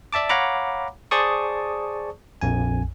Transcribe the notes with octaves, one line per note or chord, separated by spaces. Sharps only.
D5 E5 A5 D6
C#5 F5 F#5 A#5 B5 D6
G#4 C5 D5 A5 C#6 D#6
A#1 F2 G#5